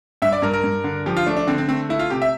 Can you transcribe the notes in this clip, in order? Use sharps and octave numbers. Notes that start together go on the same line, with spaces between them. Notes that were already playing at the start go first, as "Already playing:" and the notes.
G2 E5
D5
G2 A#4
A#4
G2
D3
F3 G4
F4
A3 D4
D4
D3 C4
C4
A3 C4
A3 E4
F4
C3 G4
E5